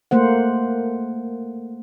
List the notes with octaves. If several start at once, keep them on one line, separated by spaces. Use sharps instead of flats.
A3 A#3 C5 F#5